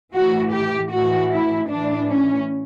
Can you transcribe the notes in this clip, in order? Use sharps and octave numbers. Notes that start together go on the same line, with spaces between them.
A2 E3 F#4
G4
A2 E3 F#4
E4
A2 E3 D4
C#4